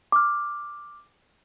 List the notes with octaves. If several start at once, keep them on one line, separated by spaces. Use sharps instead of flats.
D6 F6